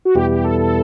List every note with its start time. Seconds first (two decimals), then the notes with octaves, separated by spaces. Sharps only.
0.05 F#4
0.15 E2 B2 G3 B3 E4 G4
0.29 G4
0.44 A4
0.59 A4